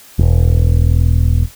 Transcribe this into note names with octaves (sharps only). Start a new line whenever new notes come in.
E1